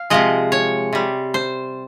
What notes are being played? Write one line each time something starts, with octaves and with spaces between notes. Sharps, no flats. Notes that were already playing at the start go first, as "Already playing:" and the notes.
Already playing: F5
C3 F3 G#3 D#5
C#5
C3 G3
C5